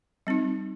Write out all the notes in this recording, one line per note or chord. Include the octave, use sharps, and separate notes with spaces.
G3 C4 D#4